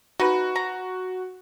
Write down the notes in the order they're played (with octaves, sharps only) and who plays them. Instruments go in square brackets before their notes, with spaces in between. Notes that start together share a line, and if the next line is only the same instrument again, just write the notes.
[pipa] D#4 B4 [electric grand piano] F#4
[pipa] A#5